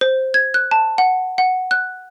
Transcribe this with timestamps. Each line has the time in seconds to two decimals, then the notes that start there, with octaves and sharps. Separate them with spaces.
0.01 C5
0.34 G#6
0.54 F#6
0.71 A5
0.98 F#5
1.38 F#5
1.71 F#6